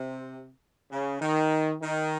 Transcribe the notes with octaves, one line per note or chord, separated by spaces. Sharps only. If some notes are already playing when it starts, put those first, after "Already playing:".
Already playing: C3
C#3
D#3
D#3